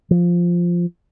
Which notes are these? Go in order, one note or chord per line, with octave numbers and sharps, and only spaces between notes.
F3